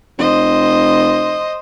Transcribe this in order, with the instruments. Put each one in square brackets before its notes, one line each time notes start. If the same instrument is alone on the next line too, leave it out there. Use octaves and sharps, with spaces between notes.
[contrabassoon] F1 [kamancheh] C5 D#5